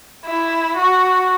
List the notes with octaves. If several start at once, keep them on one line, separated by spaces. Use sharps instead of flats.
E4
F#4